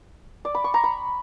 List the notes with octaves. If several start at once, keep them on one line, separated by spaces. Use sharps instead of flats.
D5
B5
C#6
A#5
B5